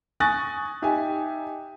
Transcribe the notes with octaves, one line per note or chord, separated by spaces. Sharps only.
G#5 C#6 D#6 F#6 A6 A#6
D#4 G4 D#5 E5 G#5